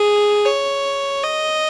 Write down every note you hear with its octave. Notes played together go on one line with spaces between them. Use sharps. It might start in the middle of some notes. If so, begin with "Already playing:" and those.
Already playing: G#4
C#5
D#5